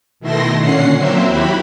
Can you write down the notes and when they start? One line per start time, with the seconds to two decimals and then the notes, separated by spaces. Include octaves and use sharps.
0.20 B2 D#3 A3 E4 C6 A#6
0.59 A#2 D3 C#4 F#5 C7
0.96 F#3 A#3 C4 C5 E5
1.27 D#2 E4 F#4 G4 B5